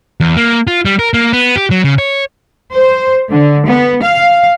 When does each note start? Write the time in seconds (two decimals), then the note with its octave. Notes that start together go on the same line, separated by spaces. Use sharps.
0.20 E2
0.37 A#3
0.67 F4
0.85 G3
0.99 A#4
1.14 A#3
1.33 B3
1.56 G4
1.71 F#3
1.84 C#3
1.98 C#5
2.73 C5
3.29 D3
3.66 B3
4.03 F5